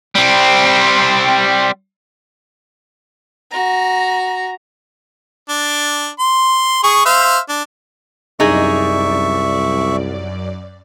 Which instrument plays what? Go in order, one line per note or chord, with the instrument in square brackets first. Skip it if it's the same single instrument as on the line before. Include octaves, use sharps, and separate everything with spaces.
[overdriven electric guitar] G3 C4
[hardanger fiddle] F#4 A#5
[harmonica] D4
C6
G#4 C#6
C5 E5 F5
D4
[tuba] C2 [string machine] F#2 D5 [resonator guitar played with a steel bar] D#4 G#4 [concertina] E5 C#6